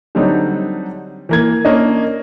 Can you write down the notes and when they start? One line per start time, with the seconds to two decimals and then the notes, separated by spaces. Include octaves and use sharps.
0.15 D3 F#3 G3 C4 D#4
1.29 E3 A#3 G#6
1.65 A#3 C#4 D4 D#5